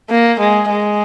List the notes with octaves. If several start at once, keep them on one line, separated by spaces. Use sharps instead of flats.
A#3
G#3
G#3